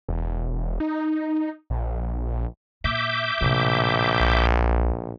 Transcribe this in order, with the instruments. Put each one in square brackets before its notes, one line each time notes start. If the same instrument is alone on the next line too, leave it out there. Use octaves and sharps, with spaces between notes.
[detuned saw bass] E1
D#4
A#1
[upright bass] A#2 [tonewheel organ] E5 D6 G6
[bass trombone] A#1 [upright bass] A2 C3
[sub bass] B1